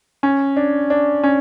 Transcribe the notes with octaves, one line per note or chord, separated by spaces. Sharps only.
C#4
D4
D4
C#4